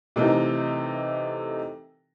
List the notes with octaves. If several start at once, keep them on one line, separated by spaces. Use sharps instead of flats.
C3 E3 A3 D#4 A4 A#4